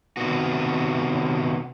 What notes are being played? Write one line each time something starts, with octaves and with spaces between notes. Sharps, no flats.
C3 D#3 B3 F#4